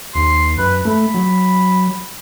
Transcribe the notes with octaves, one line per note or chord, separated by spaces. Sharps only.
D#2 C6
F#2 B4
A3 B5
F#3